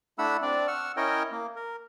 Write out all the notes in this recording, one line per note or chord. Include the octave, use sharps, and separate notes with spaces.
A3 D4 E4 F#5 B5 E6
C4 D4 D5
F#5 C#6 E6 F6
C#4 E4 A#4 C#5 D#5 G5
A#3
A#4